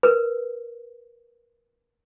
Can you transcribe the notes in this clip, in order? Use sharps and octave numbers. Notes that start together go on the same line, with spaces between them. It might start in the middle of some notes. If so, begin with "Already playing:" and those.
A#4 B4